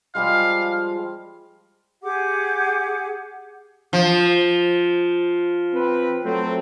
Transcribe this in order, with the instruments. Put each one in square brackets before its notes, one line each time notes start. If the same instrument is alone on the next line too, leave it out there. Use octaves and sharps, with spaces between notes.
[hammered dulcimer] F3 G3 G#3 [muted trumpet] F5
[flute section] G4 G#4 F#5 D6
[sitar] F3
[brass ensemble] C4 B4
F#3 A3 C4